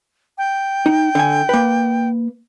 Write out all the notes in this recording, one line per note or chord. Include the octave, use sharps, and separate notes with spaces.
G5
D#4
D3 G#5
A#3 B4